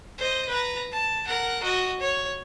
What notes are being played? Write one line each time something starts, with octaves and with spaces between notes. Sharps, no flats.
C5 D#5
B4 A#5
A5
A#4 F#5
F#4 D#5
C#5